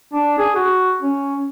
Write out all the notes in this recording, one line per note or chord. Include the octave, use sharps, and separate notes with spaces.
D4
G#4
F#4
C#4